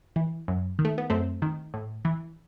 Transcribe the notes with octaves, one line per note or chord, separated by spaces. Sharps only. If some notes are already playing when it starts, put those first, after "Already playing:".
E3
F#2
D#3
A3
B3
F#2 A3 C4
D#3
A2
E3